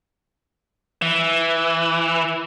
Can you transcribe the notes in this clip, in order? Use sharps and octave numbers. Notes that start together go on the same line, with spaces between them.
E3